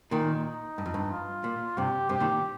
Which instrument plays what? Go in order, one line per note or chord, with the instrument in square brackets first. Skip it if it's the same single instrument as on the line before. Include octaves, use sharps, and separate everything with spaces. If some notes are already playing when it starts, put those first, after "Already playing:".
[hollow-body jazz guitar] A#2 D#3 [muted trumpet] D#4
[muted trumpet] D#4
[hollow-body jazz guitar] G2
F2
G2
[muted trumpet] F4
[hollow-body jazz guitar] A#2
[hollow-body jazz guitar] G2 C3 [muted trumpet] G4
[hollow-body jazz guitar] G2 C3 [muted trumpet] G4
[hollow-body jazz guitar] A#2 D#3